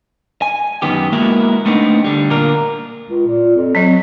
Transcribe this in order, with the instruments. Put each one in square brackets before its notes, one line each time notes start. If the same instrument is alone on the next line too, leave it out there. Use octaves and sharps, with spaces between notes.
[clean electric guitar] G#5
F#2 D#3 B3 G4
G#3 A#3 B3 E4 F#4 A#4
A3 B3 C4 D4 D#4
D3 G3
A#2 D3 A#3 F4 A#4
[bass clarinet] C#2
A#2
F2
[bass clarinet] F#3 [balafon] C4 D#5